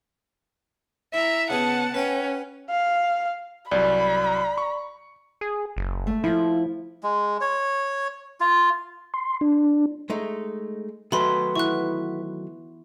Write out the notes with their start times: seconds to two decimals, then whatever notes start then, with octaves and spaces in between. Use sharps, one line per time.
1.14 E4 E5 A#5
1.50 C#3 B3 G#4 F#5 A5
1.94 C#4 B4 F#5 G5
2.69 F5
3.71 C2 F#3 D5 B5
4.58 C#6
5.41 G#4
5.77 F#1
6.07 A3
6.24 F3 E4
7.03 G#3
7.41 C#5
8.40 F4
9.14 C6
9.41 D4
10.10 G#3 A3 D#4
11.12 D#3 F#3 A3 F#4 B4 B5 C6
11.55 E3 B3 C#6 F#6